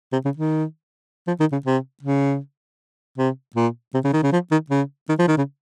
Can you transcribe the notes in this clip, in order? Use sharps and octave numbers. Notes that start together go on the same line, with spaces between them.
C3
C#3
D#3
F3
D#3
C#3
C3
C#3
C3
A#2
C3
C#3
D#3
C#3
F3
D#3
C#3
D#3
F3
D#3
C#3